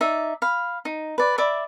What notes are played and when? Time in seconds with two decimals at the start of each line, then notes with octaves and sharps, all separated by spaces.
0.01 D#4 D5 E5
0.42 F5 B5
0.85 D#4
1.18 B4 D5
1.38 D5 E5 B5 D6